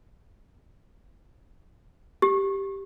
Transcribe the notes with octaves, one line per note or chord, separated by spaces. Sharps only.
G4